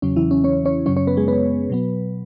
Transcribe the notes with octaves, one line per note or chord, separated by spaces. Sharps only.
E2 C#3 F#3 C#4
E3 E4
C#4
C#4 C#5
C#4 C#5
F#2 C#3 F#3 C#4 C#5
C#4 C#5
B3 B4
G#3 G#4
B3 B4
B2 F#3 B3